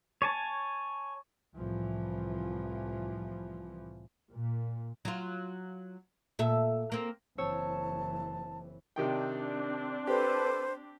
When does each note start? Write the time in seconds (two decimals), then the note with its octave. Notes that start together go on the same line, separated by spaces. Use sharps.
0.22 C#5 G#5 A5
1.55 C2 A2 E3 F3
4.31 A#2
5.05 F#3 F4
6.39 A#2 A4 E5
6.92 A#3 C4
7.38 F#1 E3 C4 C#5 A5 E6
8.96 C3 D#3 C4 D4 G5
10.07 G4 A4 B4 C5 D6